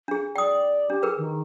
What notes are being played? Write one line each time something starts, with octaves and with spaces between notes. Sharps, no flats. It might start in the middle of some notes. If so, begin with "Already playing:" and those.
D4 G#4
D5 G5 D#6
D4 G4
G#4 A#4 B4
D#3